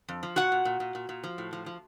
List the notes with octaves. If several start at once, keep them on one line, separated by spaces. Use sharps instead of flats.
F2
F3
A#2 F#4 F#5
A#2
A#2
A#2
A#2
A#2
F3
A2
F3
F3